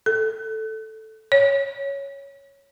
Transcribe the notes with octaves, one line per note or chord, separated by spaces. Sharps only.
A4
C#5